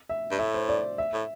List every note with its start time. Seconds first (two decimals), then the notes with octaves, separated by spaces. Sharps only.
0.09 E5
0.31 G2
0.39 A2 E5
0.54 C5
0.69 D5
0.98 E5
1.13 A2